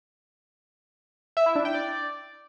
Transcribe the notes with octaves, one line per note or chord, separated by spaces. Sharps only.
E5
E4
D4
G5
D5